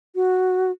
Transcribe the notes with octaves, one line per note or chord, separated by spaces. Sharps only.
F#4